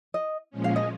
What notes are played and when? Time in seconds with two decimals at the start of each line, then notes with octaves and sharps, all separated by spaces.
0.14 D#5
0.51 A#2 F3 G#3 C#4
0.64 F5
0.76 D#5